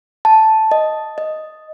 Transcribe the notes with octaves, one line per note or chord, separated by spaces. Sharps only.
A5
D#5
D#5